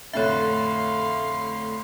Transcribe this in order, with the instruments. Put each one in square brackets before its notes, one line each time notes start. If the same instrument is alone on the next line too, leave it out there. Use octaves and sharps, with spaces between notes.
[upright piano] F2 A2 D3 [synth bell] C#5 E5 [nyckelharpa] F5 C6